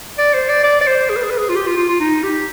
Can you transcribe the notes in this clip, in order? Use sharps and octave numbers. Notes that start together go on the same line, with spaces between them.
D5
C5
D5
D5
D5
C5
G#4
B4
G#4
B4
G#4
F4
G4
F4
F4
F4
D#4
G4